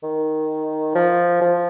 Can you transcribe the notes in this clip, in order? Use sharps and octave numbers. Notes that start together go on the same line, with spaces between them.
D#3
F3
F3